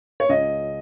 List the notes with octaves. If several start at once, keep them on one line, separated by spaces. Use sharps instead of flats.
C#5
C#2 D#5